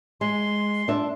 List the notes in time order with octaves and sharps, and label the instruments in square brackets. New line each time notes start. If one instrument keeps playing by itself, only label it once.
[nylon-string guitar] G#3 [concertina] C6
[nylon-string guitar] D4 E5